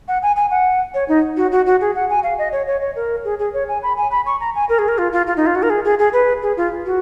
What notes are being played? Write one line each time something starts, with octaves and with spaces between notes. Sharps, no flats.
F#5
G#5
G#5
F#5
C#5
D#4
F#4
F#4
F#4
G#4
F#5
G#5
F5
D#5
C#5
C#5
C#5
A#4
G#4
G#4
C#5
G#5
B5
G#5
B5
C#6
A#5
G#5
A#4
G#4
A#4
F4
F4
F4
D#4
F4
F#4
A#4
G#4
G#4
G#4
B4
G#4
F4
F#4